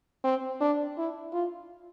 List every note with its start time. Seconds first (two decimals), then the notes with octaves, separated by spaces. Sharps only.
0.24 C4
0.61 D4
0.98 E4
1.33 F4